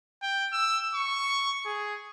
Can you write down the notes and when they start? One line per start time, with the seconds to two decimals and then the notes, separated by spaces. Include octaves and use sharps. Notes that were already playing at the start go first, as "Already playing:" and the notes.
0.22 G5
0.52 E6
0.94 C#6
1.66 G#4